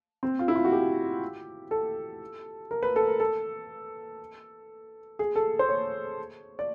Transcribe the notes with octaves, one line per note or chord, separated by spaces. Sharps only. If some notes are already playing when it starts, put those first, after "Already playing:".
C4
F4
E4
F4
F#4
G4
A4
A#4
B4
A4
A#4
A4
G#4
A4
C5
C#5
D5